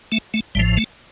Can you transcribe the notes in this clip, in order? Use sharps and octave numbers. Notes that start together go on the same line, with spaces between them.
A3
A3
A1 A2 F3 G3
A3